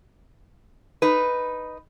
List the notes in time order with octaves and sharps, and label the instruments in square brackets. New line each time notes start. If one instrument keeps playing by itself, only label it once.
[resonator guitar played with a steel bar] D#4 B4